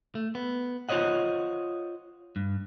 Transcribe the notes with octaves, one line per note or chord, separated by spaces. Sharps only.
A3
B3
F4 C5 C#5 D#5 F#5
G2